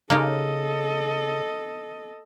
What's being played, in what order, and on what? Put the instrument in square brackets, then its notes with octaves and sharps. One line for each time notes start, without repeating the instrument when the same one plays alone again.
[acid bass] C#3 [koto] A#3 D#4 G4 [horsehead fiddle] A4 D#5